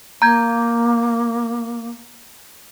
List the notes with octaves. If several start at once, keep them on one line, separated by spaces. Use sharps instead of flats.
A#3 A#5 G6 G#6